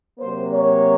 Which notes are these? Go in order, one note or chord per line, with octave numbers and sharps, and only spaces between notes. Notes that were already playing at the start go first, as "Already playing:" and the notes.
C3 F#3 A#3 C5
C#5